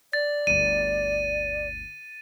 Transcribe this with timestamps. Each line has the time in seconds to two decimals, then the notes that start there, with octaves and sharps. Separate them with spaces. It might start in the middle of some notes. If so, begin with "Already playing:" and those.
0.13 D5 A6
0.47 G1 D2 D#7